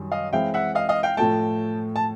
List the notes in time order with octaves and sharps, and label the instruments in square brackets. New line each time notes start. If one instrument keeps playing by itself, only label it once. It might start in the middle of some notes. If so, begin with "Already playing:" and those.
Already playing: [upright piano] F#2 D#3 G3
[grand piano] D#5 F5
[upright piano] E3 G#3 C4 E4 [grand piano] F5 G5
[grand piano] E5 F#5
D#5 F5
D#5 F5
F5 G5
[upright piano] A2 F3 A3 [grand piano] G5 A5
[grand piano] A5